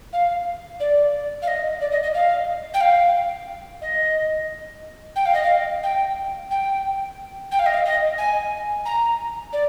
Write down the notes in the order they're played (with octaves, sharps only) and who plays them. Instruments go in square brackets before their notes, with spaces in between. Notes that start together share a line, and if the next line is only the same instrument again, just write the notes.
[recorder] F5
D5
F5
D#5
D5
D#5
D#5
F5
G5
F5
D#5
G5
F5
D#5
F5
G5
G5
G5
F5
D#5
F5
D#5
G#5
A#5
D5